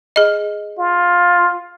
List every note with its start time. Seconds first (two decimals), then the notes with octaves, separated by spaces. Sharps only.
0.16 G#4 D#5
0.79 F4